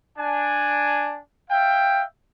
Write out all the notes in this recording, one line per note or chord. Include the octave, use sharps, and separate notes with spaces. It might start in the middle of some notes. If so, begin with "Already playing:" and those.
D4 G#5
E5 F5 G5